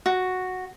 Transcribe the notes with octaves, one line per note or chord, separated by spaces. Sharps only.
F#4